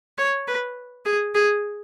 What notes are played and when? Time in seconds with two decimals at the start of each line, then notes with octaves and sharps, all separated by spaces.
0.18 C#5
0.47 B4
1.06 G#4
1.35 G#4